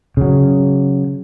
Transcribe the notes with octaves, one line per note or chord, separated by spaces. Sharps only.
C#3 F#3